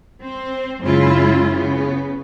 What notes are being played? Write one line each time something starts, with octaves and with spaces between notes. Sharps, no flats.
C4 C5
F#2 C#3 G#3 E4 F4
C#3 B3